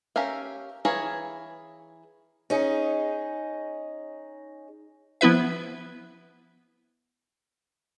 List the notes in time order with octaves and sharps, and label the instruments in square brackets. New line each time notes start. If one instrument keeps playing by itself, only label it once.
[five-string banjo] C#4 G4 A#4 E5 F5
E3 G#4 C#5 F5 A#5
[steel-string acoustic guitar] C#4 D#4 G#4
[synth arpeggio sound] F3 B3 E4 B4 E5